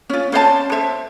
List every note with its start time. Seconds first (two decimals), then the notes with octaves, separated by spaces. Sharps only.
0.09 C#4 F4
0.32 C#4 C5 D#5 A5
0.72 C5 E5